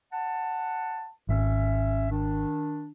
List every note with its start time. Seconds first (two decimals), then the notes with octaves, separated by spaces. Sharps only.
0.12 F#5 A5
1.29 G#1 C#4 E5
2.10 D#3 D4